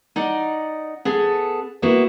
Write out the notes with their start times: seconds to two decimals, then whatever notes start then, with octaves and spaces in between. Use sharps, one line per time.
0.16 D#4 D5 F#5
1.05 B3 G#4 A4
1.82 A#3 B3 E4 F#4